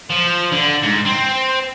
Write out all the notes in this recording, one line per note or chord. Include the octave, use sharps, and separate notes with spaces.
F3
D3
G#2
C4